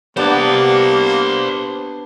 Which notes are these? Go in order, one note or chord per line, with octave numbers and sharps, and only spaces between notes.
A#3 B3 D4 G4 C5 D5